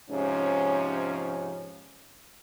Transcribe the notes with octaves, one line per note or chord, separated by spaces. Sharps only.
G#2 C3 F3 C#4